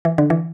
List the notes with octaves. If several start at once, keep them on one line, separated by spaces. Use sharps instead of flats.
E3
D3
E3